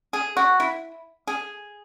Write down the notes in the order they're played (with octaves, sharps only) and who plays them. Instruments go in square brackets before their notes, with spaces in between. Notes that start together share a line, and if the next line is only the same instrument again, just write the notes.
[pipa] G#4
F#4
E4
G#4